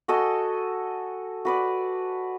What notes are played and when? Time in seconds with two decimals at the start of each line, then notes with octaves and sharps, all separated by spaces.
0.08 F#4 A4 D#5 G#5
1.45 F#4 B4 D5